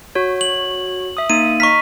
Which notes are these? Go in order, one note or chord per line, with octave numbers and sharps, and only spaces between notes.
F#4 C#5
F#7
E5 D#6
A#3 D#4 D#7
D#5 A#5 C#6 F6 B6